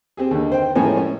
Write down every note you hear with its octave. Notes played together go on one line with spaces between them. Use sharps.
C4 G4 G#4
D#2 D3
C5 G5
A2 F3 G#3 C#4 A#4 G#5
C#4